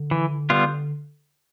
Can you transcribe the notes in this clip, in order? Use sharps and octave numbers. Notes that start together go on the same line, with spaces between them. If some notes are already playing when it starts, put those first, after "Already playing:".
Already playing: D3
E3
G3 B3 F4